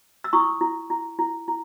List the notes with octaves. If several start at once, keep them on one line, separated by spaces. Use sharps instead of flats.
E6
E4 C#6 D#6
E4
E4
E4
E4